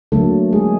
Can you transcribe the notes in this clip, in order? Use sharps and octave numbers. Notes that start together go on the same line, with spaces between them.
D3 F#3 A3 A#3 A4
G#3 G#4